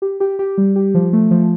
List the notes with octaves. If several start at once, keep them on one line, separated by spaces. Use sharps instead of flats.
G4
G4
G4
G3
G4
F3
A3
F3